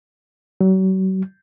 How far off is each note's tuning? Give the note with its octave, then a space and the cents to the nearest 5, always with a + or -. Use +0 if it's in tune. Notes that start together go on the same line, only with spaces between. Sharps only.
F#3 +40